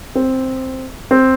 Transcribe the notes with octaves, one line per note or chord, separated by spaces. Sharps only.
C4
C4